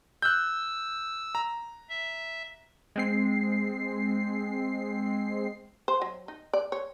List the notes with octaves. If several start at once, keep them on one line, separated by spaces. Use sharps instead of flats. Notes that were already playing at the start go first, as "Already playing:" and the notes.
E6 F#6 G6
A#5
E5
G#3 C4 C7
C5
F#3
D#4
D5
C#5